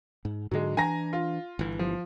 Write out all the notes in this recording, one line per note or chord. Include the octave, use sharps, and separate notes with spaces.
G#2
G#2 D3 F#3 G#3
E3 D4 G#5 A#5 A#6
F4
G1 E3
F3